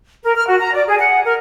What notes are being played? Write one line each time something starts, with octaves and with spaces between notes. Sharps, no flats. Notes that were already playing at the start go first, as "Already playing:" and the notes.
A#4
F6
F#4
A#5
D5
G#4
F#5
A#4